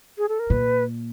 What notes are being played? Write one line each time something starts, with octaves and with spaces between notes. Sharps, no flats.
G#4
A4
A#4
A#2 B4